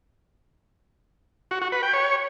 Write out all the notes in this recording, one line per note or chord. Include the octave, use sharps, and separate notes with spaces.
F#4
F#4
B4
G5
C#5